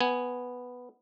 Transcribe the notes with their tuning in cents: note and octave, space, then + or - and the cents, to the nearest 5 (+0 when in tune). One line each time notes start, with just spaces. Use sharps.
B3 +0 G#5 +0